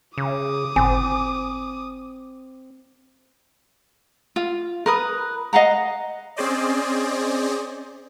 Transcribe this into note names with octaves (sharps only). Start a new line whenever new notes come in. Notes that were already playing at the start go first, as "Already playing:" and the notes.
C#3 D6 D#6
G1 A2 C4 G#5
F4
A#4 B4 D#6
D#5 F5 F#5 A#5
C4 C#4 G#4 C5 D5 D#5